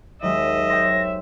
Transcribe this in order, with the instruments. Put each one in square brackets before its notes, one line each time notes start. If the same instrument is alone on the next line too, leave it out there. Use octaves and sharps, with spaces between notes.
[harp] D#2 F#3 G#3 [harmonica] D#5 [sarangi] E5
[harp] C5 C#5 G5 [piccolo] A#6